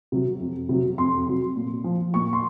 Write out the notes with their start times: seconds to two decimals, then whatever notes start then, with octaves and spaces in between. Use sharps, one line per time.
0.12 C3 F#3
0.40 F2
0.69 C3 F#3
0.98 F2 C6
1.27 C3 F#3
1.56 A#2
1.84 F3
2.14 A#2 C#6
2.33 C6